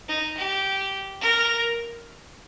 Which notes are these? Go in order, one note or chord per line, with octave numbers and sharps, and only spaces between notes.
D#4
G4
A#4